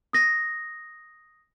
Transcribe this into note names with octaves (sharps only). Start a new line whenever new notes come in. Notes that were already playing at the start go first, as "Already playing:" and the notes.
D#6 A#6